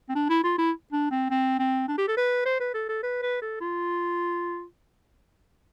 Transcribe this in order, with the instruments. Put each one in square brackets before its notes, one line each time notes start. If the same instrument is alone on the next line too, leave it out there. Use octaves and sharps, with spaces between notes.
[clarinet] C4
D4
E4
F4
E4
D4
C4
C4
C4
D4
G4
A4
B4
C5
B4
A4
A4
B4
B4
A4
F4